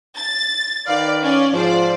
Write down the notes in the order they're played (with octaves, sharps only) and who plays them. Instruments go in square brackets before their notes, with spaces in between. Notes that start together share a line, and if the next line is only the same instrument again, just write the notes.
[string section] A6
[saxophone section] D#3 B4 F5 [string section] D5
[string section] C#4 D5
[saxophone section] G#2 F3 [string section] C5 D5